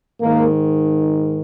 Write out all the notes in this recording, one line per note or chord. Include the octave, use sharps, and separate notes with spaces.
G#2 D#3 A#3